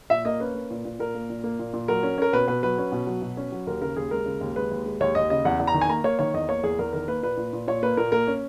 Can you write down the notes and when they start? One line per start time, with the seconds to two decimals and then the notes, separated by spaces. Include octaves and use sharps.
0.10 A#2 E5
0.25 A#3 D#5
0.40 C#4 B4
0.55 A#3
0.70 A#2
0.85 A#2
0.99 A#2 A#4
1.15 A#3
1.30 A#2
1.44 A#3
1.59 A#2
1.74 A#2
1.88 F#3 A#4
2.03 C#4
2.18 C#4 A#4
2.33 B2 B4
2.48 B2 B4
2.63 F#3 B4
2.78 C#4
2.92 B2
3.07 F#3
3.22 B2
3.37 C#4
3.52 F#3
3.67 D#2 A#4
3.81 C#3 A#4
3.96 D#2 G#4
4.11 G#3 A#4
4.26 C#3
4.41 D#2
4.56 G#3 B4
4.71 D#2
4.86 G#3
5.00 D#2 C#5
5.15 D#2 D#5
5.30 C#3 D#5
5.45 E2 F#5
5.60 E2
5.67 A#5
5.74 D#3
5.81 G#5
5.89 A#3 A#5
6.04 A#3 C#5
6.19 D#3 C#5
6.34 E2 D#5
6.49 A#3 C#5
6.63 E2 G#4
6.79 E2 A#4
6.93 D#3 A#4
7.08 A#3 B4
7.23 A#2 B4
7.37 A#2
7.53 A#2
7.67 A#2 C#5
7.83 A#3 B4
7.97 A#2 A#4
8.12 A#3 A#4
8.27 C#4